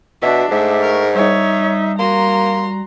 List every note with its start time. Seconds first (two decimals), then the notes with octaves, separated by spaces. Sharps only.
0.22 B2 D4 F#4 E5 B6
0.51 G#2 A3 E5 D6
0.82 A#4 C#6
1.15 G3 D#4 C#5 E5
1.99 A#3 F#4 A#5 C6